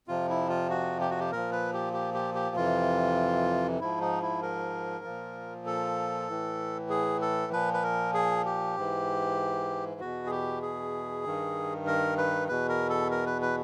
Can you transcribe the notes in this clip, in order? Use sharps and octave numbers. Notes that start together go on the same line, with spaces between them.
F2 C3 F3 F4
E4
F4
F#4
G4
F#4
G4
A#2 F3 A#4
B4
G4
G4
G4
G4
F2 C3 E3 F4
G#2 F3 E4
D#4
E4
A#4
A#2 F3
A4
A2 E3
G#4
A4
A#2 F3 B4
B4
A#4
G#4
G4
G#2 E3
E2 B2 F#4
G#4
G4
G#4
G2 D#3
A#4
B4
E2 B2 B4
A#4
A4
A#4
B4
B4